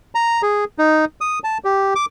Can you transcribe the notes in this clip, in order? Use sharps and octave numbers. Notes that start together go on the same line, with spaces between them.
A#5
G#4
D#4
D#6
A5
G4
D6